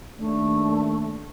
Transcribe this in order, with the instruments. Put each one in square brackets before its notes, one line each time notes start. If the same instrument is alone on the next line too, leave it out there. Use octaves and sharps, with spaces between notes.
[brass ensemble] D#2 D4 [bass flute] A3